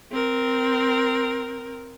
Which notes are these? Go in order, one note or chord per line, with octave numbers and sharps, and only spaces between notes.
C4 A#4